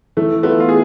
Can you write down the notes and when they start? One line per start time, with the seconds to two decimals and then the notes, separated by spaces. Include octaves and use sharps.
0.17 E3 A3
0.43 A3 B3 F4 B4
0.60 F4
0.69 G#4